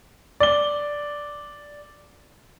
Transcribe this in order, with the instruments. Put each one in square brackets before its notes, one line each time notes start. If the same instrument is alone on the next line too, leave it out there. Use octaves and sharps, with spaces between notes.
[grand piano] D5 G7